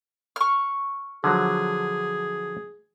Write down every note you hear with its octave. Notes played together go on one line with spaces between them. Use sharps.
C#6 F6
D3 F3 F#3 G#4